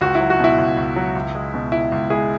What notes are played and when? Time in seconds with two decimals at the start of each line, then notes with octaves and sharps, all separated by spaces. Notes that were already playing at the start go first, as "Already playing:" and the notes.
0.01 C#2 F#4
0.15 E4
0.21 F#3
0.30 F#4
0.39 B2 E4
0.58 C#2
0.77 C#2
0.96 F#3
1.16 C#2
1.35 G#3
1.54 B2
1.72 C#2 E4
1.92 C#2
2.10 G#3 E4 G#4